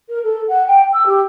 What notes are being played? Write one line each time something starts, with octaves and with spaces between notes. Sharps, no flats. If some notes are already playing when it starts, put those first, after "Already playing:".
A#4
A4
F#5
G5
E6
G4